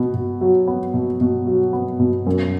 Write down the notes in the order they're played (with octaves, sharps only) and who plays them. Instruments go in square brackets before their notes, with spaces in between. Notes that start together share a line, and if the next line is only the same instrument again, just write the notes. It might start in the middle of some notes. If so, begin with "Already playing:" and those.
Already playing: [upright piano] B2 B3
B2
F#3
B3
B2
B2
F#3
B3
B2
F#2